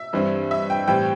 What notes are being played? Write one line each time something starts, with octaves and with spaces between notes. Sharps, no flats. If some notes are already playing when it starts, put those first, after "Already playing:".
Already playing: E5
G2 E3 G3 C4
E5
G5
A2 E3 G3 C4 G5